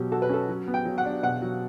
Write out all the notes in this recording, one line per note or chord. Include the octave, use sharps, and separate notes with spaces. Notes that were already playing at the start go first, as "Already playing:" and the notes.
Already playing: B2 F#3 G4
F#4 A4
B4
C#4 A4
F#3
B3
G5
F#3
F#5
D4
B2 F#5
F#3